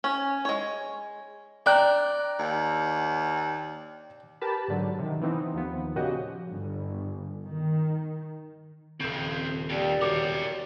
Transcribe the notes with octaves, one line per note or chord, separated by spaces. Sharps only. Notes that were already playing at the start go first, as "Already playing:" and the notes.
C#4
G#3 C#5
D4 G5 A#5 F#6
D#2
G4 A#4 B4 A5 B5
G#2 D3 F#3
C3 D#3
E3 B3 C4 D#4
D#2 F3 B3
A#2 C#3 F3 F#4 G4 D#5
G1
D#3
D#1 C#3 F3 C4
C5
D#2 G4 D5
E1 A#4 C#5 D6